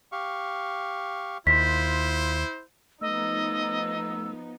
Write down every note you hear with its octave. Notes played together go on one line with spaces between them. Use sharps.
G4 F5 C#6
D#2 E4 F4 C5 B6
F3 A3 B3 D#4 D#5 E6